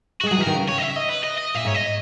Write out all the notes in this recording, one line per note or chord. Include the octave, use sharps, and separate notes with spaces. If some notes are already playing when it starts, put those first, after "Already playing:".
G#3 F#4
F#3 G#4
E3 A#4
D#3
C#3
C#5
D#5
E5
D#5
B4
D#5
D#5
A#2 E5
G#2 C#5
D#5